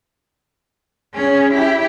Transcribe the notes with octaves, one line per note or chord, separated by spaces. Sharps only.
C#4 G#4
E4 G4